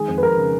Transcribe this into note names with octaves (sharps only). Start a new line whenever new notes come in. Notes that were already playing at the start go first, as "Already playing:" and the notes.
Already playing: D#3 G#3 G#4
F2
B4
F2 A#4
C#3